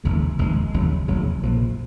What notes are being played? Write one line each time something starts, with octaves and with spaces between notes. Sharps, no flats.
F1 D#2 C#3 G#3
F1 D#2 C#3 G#3
F1 D#2 C#3 F#3
F1 D#2 C#3 F#3
A#1 A#2 F3